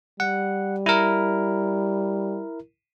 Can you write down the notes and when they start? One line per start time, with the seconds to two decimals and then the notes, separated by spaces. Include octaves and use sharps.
0.20 G3 F#5
0.86 E4 A#4